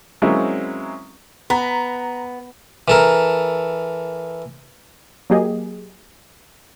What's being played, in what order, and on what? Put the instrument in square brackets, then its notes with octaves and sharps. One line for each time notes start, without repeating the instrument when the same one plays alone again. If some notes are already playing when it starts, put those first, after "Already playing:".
[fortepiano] F#3 G#3 A#3 C4 C#4 E4
[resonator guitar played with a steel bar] B3 [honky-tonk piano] A#5
[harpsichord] E3 A4 A#4
[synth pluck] F#3 A#3 G4 G#4 D#5